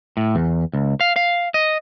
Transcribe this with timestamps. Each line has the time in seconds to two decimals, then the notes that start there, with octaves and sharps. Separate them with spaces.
0.17 A2
0.35 E2
0.73 C#2
1.01 F5
1.16 F5
1.54 D#5